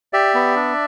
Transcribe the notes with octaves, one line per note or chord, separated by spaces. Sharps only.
G4 D5 E5
B3
D4